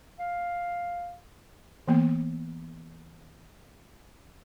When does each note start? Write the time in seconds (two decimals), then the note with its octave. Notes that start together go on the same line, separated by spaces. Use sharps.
0.19 F5
1.88 E3 A#3 B3